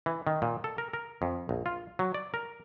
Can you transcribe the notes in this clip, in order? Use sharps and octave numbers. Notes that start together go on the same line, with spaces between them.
E3
D#3
A#2
A4
A#4
A#4
F2
A#1
F4
F#3
D5
A#4